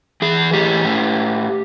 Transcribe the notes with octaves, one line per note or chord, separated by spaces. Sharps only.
E3 G#4
A2 G4
A2